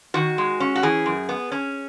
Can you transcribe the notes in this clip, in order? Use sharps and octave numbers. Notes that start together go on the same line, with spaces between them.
D#3 F#4
G#3
C#4
F#4
E3 G#4
F#2
B3
C#4